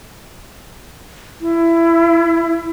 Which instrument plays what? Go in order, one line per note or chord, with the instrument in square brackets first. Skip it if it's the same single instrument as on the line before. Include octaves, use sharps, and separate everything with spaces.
[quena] E4